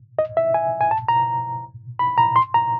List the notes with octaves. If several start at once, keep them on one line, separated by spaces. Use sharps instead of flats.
D#5
E5
G#5
G#5
A5
A#5
B5
A#5
C6
A#5